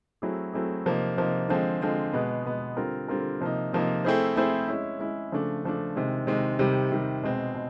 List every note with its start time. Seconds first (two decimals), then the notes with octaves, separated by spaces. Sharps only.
0.22 F#3 A3 C4 E4 G#4
0.54 F#3 A3 C4 E4 G#4
0.86 C3 F3 A#3 D#4
1.17 C3 F3 A#3 D#4
1.49 D3 F3 G#3 C4
1.82 D3 F3 G#3 C4
2.13 B2 G#3 B3
2.45 B2 G#3 B3
2.77 D3 G3 C4 F4 A#4
3.08 D3 G3 C4 F4 A#4
3.41 C3 F3 A#3 D#4
3.73 C3 F3 A#3 D#4
4.05 A3 C4 E4 G#4 C5
4.36 A3 C4 E4 G#4 C5
4.68 G#3 C#4 E4
5.00 G#3 C#4 E4
5.32 C#3 F3 A3 D4
5.64 C#3 F3 A3 D4
5.96 C3 D#3 G#3
6.27 C3 D#3 G#3
6.59 C3 D#3 G3
6.92 C3 D#3 G3
7.23 B2 G#3 C4
7.54 B2